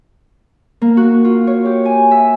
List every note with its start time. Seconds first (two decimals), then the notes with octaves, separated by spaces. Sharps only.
0.82 A#3
0.97 F#4
1.24 F4
1.47 C#5
1.66 G4
1.85 G#5
2.11 E5